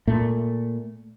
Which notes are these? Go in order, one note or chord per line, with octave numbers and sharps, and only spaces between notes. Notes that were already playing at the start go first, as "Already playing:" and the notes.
A#2 A3